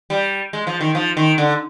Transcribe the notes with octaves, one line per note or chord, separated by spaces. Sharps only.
G3
G#3
F3
D#3
F3
D#3
D3